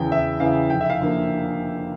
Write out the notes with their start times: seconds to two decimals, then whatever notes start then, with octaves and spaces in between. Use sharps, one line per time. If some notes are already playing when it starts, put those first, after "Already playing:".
Already playing: E2 C#3 E3 G5
0.11 E2 E5
0.40 C#3 E3 F5
0.70 F1 G5
0.81 E5
0.90 F5
1.01 D3 F3 A#3